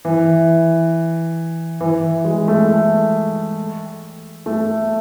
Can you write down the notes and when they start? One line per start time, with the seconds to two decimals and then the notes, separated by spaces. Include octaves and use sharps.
0.05 E3
1.81 E3
2.25 G#3
2.48 A3
4.46 A3